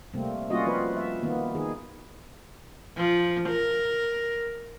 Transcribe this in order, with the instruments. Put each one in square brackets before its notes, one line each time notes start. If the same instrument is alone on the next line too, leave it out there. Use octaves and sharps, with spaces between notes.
[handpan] C3 G3 A3 A#3 C4
G3 A#3 C#4 F4 F#4 D#5
F3 C4 F4 B4
E5
D#3 A#3 B3
D#3 D#4 G#4
[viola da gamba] F3
A#4